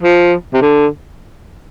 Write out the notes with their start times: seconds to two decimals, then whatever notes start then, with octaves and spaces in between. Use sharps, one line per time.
0.03 F3
0.54 C3
0.62 D3